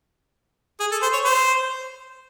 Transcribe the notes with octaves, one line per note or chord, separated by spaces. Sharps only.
G#4
A4
C5
C#5
C5